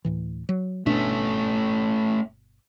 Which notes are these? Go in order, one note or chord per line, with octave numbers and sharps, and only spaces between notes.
D2 A2 E3
F#3
G1 B2 A3 C#4 D4